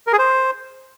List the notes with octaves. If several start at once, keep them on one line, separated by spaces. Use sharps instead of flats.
A#4
G#4
C5